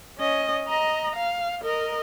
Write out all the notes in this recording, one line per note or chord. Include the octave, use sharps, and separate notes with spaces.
C#4 D#5
D#5 A#5
F5
A#4 D#5